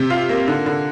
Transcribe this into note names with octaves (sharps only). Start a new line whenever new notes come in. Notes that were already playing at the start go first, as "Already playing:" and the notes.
Already playing: C3
F4
A#3
D3
D3